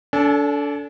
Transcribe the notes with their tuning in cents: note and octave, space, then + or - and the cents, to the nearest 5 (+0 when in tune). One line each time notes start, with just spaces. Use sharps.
D4 -30 A4 +0 G#5 +30